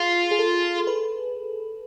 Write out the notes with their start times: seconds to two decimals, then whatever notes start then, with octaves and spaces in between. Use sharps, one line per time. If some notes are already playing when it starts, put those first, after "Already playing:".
Already playing: F4 G#4
0.31 G#4
0.39 A4
0.87 B4